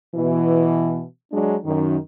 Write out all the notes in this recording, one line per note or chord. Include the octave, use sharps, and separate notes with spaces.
B2 E3
F#3 G#3 D4
F#2 D#3